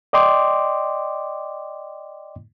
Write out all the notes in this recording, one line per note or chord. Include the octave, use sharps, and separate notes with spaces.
D5 D#5 G5 C6 D6